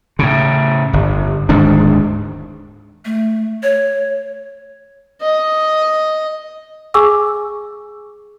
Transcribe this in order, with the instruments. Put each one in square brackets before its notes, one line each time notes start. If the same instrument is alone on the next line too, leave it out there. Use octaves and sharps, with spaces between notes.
[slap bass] A2 C#3
G1
D1 G#2 D#3 D4
[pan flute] A3
C#5
[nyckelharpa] D#5
[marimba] G#4 G#5 C#6 D6 E6